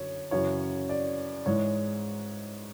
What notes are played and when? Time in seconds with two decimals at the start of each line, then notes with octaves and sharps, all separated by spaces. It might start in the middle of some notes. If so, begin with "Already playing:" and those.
Already playing: F#2 D3 C#5
0.31 F#2 C#3 E3 C#5
0.89 D5
1.46 G#2 E3 G#3 C#5